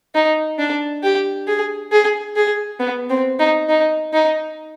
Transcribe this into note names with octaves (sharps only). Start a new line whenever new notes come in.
D#4
D4
G4
G#4
G#4
G#4
B3
C4
D#4
D#4
D#4